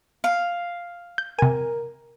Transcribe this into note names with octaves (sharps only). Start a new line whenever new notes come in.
F5
G6
C3 A#4 G#5